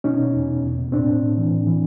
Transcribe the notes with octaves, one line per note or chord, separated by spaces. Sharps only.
B2 C#4 D#4
B2
E2
B2
E2
B2
A2 C4 D4
A2
A2
E3
A2
E3